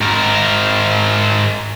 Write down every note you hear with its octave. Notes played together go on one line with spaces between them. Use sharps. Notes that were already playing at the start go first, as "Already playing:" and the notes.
G#2 A#4